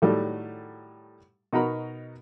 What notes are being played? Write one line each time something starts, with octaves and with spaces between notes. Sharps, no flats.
A2 D#3 F#3 G3 A3
B2 D#4 F#4 A#4 B5